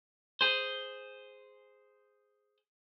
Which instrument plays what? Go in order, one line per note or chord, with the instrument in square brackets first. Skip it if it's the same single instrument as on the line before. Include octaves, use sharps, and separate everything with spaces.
[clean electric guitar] G#4 C5